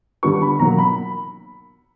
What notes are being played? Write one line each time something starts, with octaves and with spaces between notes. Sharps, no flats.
D3 G3 B3 C#6
B5
B2 F#3 A#3 A#5
B5